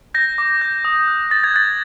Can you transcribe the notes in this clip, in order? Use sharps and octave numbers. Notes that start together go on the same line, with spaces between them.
G6 A#6
D6
G6
D#6
F#6
D#6 A6
G#6
F#6 A6